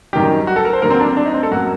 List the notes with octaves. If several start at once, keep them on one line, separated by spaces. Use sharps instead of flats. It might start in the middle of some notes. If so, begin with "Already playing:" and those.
F#2 D#3 G3 G4
F#4
A4
A#4
C5
D#2 D3 F#3 A#3 A#4
C4
D4
C4
D4
D#4
C4
A4
F#2 F#3 A#3 F#4